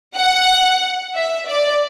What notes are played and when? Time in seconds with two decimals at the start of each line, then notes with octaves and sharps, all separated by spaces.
0.16 F#5
1.16 E5
1.48 D5